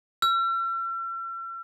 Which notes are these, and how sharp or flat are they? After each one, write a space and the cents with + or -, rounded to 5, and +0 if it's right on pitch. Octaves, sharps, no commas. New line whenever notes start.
E6 +45